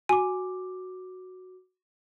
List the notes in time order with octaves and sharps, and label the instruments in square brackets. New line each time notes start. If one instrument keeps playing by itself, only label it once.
[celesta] F#4 D6 [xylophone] G#5